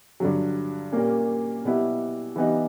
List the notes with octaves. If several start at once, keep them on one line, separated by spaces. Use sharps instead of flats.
G2 D3 F#3
A#2 G3 A#3 C#4
B2 G3 B3 E4
E3 G3 B3 D#4